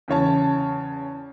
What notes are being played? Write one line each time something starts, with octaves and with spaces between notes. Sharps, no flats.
E2 C#3 C#5 A5